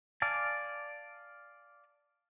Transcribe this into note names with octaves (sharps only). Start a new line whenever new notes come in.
D5 F5 G#5 A5